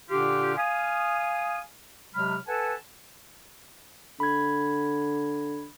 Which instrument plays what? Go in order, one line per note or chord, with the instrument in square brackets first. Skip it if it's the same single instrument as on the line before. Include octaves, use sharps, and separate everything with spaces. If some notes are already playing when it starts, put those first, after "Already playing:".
[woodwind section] A#2 D3 D4 F4 G4
F5 G#5 D#6
C3 F#3 G#3 B5 F6
A4 B4 F#5 G#5 A5
[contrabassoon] D3 [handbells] B5 G#6